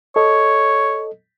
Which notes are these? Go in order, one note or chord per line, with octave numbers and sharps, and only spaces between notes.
A4 C#5 D#5